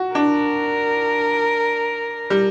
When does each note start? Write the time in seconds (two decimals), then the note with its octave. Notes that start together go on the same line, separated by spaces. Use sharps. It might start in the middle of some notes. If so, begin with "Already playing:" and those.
Already playing: F#4
0.15 D4 A#4
2.30 G3